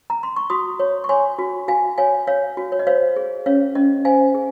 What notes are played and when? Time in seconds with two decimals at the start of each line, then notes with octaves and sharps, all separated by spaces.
0.10 A#5
0.23 C6
0.36 C#6
0.50 F#4 C6 D#6
0.80 C#5
1.04 C#6
1.09 C#5 G#5 C6
1.39 F#4
1.68 F#4 F5 G#5
1.98 C#5 F5 G#5
2.27 C#5 F5
2.57 F#4
2.72 C#5
2.79 D#5
2.87 C5 C#5 F5
3.17 G#4
3.46 C#4 C#5 F5
3.75 C#4 D#5
4.05 C5 F5 G#5
4.35 G#4